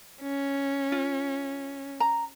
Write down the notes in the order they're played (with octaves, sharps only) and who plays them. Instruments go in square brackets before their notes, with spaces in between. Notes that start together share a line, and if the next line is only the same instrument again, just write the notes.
[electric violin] C#4
[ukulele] F4
A#5